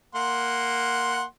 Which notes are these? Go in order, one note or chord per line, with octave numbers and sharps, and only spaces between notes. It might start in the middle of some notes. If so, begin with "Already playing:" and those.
A#3 F#5 C6